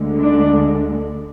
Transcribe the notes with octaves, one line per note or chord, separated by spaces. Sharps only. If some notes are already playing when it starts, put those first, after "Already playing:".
Already playing: D2 D3 G#3
D4